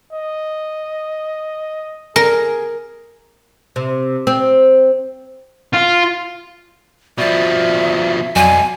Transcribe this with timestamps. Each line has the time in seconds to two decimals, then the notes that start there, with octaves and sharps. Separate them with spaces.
0.13 D#5
2.16 G#4 A#4
3.76 C3
4.27 C4
5.74 F4
7.18 B2 F3 D5 E5
8.36 B1 F2 F#3 D5 G#5